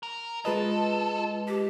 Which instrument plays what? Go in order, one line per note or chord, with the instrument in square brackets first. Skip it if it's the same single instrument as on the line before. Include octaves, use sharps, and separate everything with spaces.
[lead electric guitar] A#4
[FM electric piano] G#3 B4 D#5 [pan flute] F4 [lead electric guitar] A4
[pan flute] G4